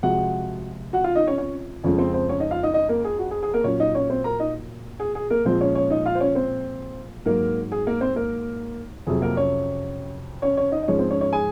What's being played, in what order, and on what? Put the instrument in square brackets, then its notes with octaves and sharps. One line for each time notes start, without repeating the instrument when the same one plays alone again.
[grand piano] C3 F3 G#3 F#4 F#5
F#4 F#5
F4 F5
D#4 D#5
C#4 C#5
C#4 C#5
F2 C#3 F3 G#3 C#4 C#5
C4 C5
C4 C5
C#4 C#5
D#4 D#5
F4 F5
D#4 D#5
D#4 D#5
A#3 A#4
G#4
F#4
G#4
G#4
A#3 A#4
A#2 F#3 C#4 C#5
D#4 D#5
C#4 C#5
C4 C5
A#4 A#5
D#4 D#5
G#4
G#4
A#3 A#4
A#2 F3 G#3 C4 C5
C#4 C#5
C#4 C#5
D#4 D#5
F4 F5
C5
C#4 C#5
C4 C5
G#2 F#3 A#3 A#4
G#4
A#3 A#4
C4 C5
A#3 A#4
F2 C3 F#3 G#4
A#3 A#4
C#4 C#5
C#4 C#5
C#4 C#5
D#4 D#5
D#5
G#2 F3 G#3 C#4 C#5
C4 C5
C#4 C#5
C#4 C#5
G#4 G#5